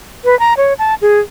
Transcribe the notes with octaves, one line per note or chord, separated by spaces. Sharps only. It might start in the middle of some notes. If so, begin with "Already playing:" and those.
B4
A#5
C#5
A5
G#4